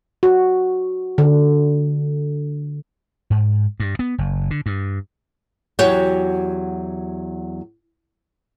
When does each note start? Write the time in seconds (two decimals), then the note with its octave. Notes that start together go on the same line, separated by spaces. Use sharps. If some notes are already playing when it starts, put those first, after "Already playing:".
0.23 F#4
1.18 D3
3.30 G#2
3.80 G2
3.99 B3
4.18 F#1
4.51 D3
4.66 G2
5.79 E2 F#3 F#4 G4 C#5 G5